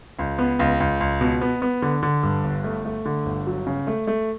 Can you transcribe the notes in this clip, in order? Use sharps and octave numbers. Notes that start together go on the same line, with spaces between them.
C#2
B3
C#2
C#2
C#2
B2
B3
B3
D3
D3
G2
G1
A3
A3
D3
G1
F#3
C#3
A3
A3